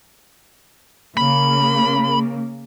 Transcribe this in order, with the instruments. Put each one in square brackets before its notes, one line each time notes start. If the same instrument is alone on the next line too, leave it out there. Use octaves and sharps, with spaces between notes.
[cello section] C#3 A#3 [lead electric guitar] B5